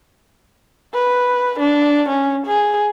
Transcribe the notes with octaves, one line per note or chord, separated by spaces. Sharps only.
B4
D4
C#4
G#4